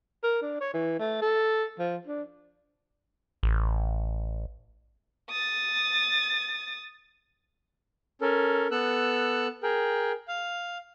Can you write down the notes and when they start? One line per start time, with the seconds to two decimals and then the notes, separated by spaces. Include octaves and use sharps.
0.23 A#4
0.42 D4
0.61 C#5
0.74 E3
0.99 A3
1.22 A4
1.79 F3
2.07 D4
3.43 A1
5.31 D#6 A6
8.21 C#4 A4 A#4
8.71 B3 A4 E6 F#6
9.63 G#4 A#4 G5
10.28 F5